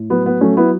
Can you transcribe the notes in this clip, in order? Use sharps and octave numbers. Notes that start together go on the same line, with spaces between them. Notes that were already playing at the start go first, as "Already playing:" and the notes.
Already playing: A2
F#3 B3
B3
F#3 A3 C#4
B3 E4